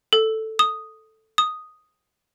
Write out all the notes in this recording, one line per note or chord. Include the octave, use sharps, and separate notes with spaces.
A4
D#6
D#6